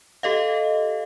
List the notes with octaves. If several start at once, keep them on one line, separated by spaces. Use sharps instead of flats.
G4 A4 D#5 F5